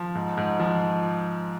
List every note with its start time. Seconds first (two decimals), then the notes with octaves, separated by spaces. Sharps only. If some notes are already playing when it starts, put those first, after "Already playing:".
Already playing: F3
0.15 G#2
0.37 G#2
0.59 F3